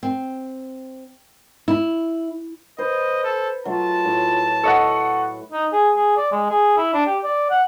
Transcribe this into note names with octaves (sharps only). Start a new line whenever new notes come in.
C4
E4
B4 C5 D#5
A4
F#3 A3 F4 A5
A2
A4 D#5 F#5 C#6
D#4
G#4
G#4
D5
G#3
G#4
E4
D4
G4
D5
F#5